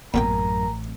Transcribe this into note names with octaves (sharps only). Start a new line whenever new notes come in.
A1 F#2 A#2 B3 A#4 G5 G#5 A#5